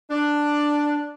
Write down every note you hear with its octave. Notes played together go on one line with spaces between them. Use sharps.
D4